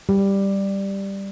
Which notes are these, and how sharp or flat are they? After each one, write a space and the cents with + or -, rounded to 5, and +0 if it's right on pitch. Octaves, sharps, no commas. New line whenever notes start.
G3 +5